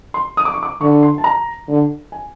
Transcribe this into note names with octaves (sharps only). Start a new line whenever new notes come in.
C6
D#6
D6
C#6
D6
D3 C#6
C6
A5
A#5
D3
G#5